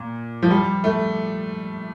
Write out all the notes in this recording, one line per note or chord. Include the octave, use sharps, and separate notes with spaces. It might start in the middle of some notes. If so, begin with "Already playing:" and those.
Already playing: A#2
F3
G3
A3